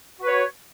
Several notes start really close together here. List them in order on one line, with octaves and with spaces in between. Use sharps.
F#4 B4 C#5